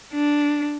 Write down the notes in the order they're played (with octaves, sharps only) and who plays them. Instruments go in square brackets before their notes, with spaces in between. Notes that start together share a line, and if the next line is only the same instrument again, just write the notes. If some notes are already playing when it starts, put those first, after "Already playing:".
[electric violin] D4